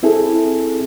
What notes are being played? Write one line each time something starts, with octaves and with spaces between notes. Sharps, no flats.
C4 E4 G#4 A4